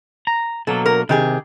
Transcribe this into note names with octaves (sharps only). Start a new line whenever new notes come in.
A#5
B2 F#3 A#3 A4
A#4
C3 D#3 G4 G#4